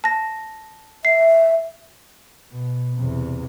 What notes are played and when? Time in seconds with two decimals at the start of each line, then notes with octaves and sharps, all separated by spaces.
0.04 A5 A#6
1.05 E5 C7
2.53 B2
2.95 E2 C3